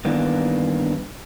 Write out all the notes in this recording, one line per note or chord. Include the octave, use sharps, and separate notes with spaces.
G2 D#3 E3 A#3 B3 D4